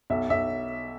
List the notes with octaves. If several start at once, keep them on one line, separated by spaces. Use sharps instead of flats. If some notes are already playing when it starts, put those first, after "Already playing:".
B1 E5
B1 E5